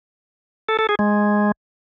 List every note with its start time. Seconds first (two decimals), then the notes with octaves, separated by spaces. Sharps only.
0.69 A4
0.79 A4
0.89 G#4
0.99 G#3